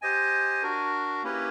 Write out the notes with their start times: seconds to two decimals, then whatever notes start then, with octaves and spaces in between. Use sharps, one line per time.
0.02 G4 C5 D#5 G#5
0.62 D4 F#4 A#4
1.23 A#3 C#4 E4 G4 B4